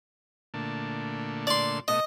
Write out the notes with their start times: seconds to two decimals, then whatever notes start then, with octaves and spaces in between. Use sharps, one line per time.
0.54 A#2 D3 A3
1.47 D5 C6
1.88 B2 A3 D#5 D#6